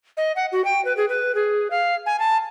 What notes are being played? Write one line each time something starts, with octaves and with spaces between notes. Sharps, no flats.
D#5
F#5
F#4
G5
B4
G#4
B4
G#4
F5
G#5
A5